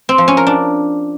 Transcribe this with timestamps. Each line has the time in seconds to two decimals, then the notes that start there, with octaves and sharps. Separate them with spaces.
0.09 C4
0.18 F3
0.28 C#4
0.37 A#4
0.47 D4